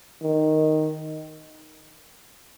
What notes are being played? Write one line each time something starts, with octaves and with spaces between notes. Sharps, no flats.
D#3